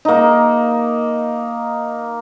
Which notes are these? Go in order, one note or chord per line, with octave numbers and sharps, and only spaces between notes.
A#3 D#4